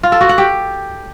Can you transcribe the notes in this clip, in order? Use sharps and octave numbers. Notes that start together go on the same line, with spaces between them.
F4
A4
F#4
F#5
G4